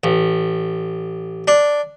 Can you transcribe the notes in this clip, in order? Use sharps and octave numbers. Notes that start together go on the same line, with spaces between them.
A1
D4